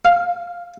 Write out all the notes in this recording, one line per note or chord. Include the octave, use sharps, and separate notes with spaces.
F5